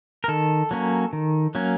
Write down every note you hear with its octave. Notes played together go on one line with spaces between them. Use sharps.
A#4
D#3 A4
F#3 A#3 C#4
D#3
F#3 A#3 C#4